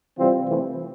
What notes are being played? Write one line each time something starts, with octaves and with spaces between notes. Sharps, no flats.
C3 E3 G3 C4 F4
C3 E3 A3 C4